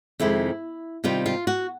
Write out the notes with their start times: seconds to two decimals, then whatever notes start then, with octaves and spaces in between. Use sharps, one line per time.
0.20 F2 C3 D#3 G#3 E4
1.04 C3 D#3 G3 F4
1.26 F4
1.47 F#4